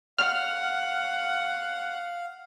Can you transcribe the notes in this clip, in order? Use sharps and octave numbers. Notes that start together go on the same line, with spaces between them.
F5 F#5 F6